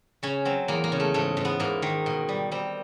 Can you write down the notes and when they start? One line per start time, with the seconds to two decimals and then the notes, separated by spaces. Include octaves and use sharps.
0.23 C#3 C#4
0.45 F#3 C4
0.68 E2 A#3
0.84 A#3
0.92 C#3
1.00 A3
1.14 G#2 A3
1.37 G#2
1.45 B3
1.60 G#2 A#3
1.82 D#3
2.06 B2
2.29 G3
2.52 G3 C4